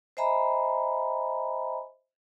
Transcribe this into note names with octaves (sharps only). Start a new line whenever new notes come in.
C5 D#5 E5 G#5 A#5 B5